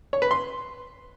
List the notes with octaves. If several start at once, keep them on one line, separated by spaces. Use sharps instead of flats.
C#5
B4
C6